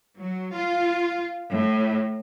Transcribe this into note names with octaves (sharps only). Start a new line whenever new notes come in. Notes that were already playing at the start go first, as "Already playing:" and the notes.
F#3
F4
A2